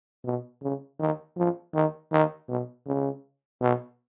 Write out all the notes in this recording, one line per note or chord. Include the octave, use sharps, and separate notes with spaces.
B2
C#3
D#3
F3
D#3
D#3
B2
C#3
B2